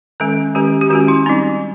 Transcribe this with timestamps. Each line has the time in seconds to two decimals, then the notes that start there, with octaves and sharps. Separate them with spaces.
0.20 D#3 G#3 C#4 A4
0.55 D#3 G#3 C#4 G4
0.81 G4
0.90 D#3 G#3 C#4 F#4
1.08 E4
1.26 G3 C4 D#4